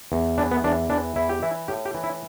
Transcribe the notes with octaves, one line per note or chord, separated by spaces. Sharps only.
E2
E3 D4
B3
E2 D4
E3 D4
E2 E4
G4
E3 E4
A2 G4
G4
E3
E4